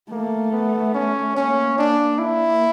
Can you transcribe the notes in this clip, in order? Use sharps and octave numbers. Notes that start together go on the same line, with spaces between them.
A3 A#3
B3
C#4
A#3 C#4
D4
A#3 E4